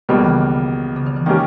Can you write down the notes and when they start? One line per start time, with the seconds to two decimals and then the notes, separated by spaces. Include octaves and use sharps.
0.09 C#2 B2 D#3 G3 A#3
0.19 E3
0.28 C#3
0.38 D#3
0.53 C#3
0.96 C#3
1.06 D#3
1.16 E3
1.26 D#3 G#3 A#3 C#4 G4